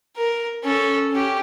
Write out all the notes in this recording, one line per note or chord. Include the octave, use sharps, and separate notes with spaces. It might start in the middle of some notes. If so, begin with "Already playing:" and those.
A#4
C#4 A4
C#4 G4